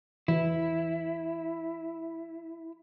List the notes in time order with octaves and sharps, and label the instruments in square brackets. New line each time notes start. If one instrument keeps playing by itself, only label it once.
[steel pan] E3 [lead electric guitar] E4